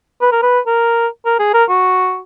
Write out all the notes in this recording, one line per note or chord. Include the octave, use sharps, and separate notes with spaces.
B4
A#4
B4
A#4
A#4
G#4
A#4
F#4